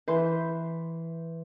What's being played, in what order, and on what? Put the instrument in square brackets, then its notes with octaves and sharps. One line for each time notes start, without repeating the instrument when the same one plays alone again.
[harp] E3 B4 C5 C6 G6